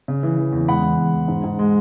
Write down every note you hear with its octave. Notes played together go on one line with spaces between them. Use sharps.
C#3
E3
E3
E2
G#3 F#5 B5
E2
E2
E2
G#2
G#2
G#3